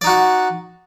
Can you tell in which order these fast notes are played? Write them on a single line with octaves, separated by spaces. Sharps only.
D5 D#4 F#4 F#5